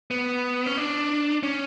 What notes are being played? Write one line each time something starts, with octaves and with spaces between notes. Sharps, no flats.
B3
C#4
D4
C#4